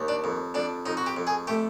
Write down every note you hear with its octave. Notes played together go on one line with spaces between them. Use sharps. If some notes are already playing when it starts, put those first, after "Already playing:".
Already playing: D#2
D4
F2
F2 D4
F2 D#4
F#4
G4
F2
G#4
A3 G4